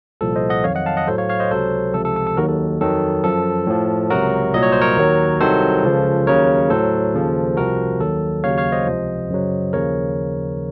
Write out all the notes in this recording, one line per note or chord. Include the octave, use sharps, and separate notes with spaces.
C2 A#2 F3 A4
C5 D#5
D#5 F#5
F2 D#3 F#3 C#5 F5
D#5 F#5
F5 A5
D#5 F#5
A2 F#3 A4 C5
C#5 F5
C#5 F5
C5 D#5
C#2 C3 F#3 A4 C5
C#2 C3 F3 A4
A4
A4
A4
D#2 D#3 F#3 F#4 A#4
A4
F2 D#3 F#3 A4
F#2 F3 A4
A2 F3
C#2 C3 F#3 F#4 A#4
C2 A#2 F#3 D#5
C#5
C5
A#4 C#5
D#2 D#3 F#3
C2 C3 D#3 F#3 A4 C5
C#2 C#3 F3
D#2 C#3 F#3 A#4 C#5
A2 F#3 A4 C5
D#2 C#3 F3
C2 C3 F3 F#4 A#4
D#2 D#3 F#3 A4
D#2 C#3 F#3 C#5 F5
C#5 F5
C5 D#5
C#2 C3 F3
F#2 C#3 F#3
D#2 C#3 F3 A#4 C#5